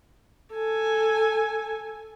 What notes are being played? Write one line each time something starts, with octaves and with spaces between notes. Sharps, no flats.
A4 G#5